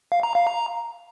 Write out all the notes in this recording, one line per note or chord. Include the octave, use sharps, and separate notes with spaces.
F5
A#5
F5
A#5